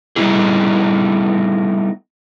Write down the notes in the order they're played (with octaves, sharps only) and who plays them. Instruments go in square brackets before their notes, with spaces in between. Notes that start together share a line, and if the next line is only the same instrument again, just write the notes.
[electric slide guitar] G3 A3 B3 D#4 E4 G#4